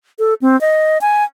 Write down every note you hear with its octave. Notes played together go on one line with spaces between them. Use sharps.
A4
C4
D#5
G#5